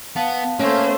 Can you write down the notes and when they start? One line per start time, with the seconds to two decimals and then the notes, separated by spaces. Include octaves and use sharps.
0.16 B3 F5 A5
0.59 A3 A#3 C#4 C5